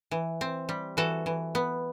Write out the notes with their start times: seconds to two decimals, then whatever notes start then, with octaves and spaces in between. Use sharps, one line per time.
0.11 E3
0.41 C4
0.69 G3
0.97 E3 F#4 A4
1.26 E3
1.55 B3